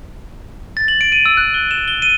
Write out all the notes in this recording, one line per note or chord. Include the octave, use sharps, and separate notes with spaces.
A6
F#7
D7
D#7
E6
F#6
G7
E7
G7
D#7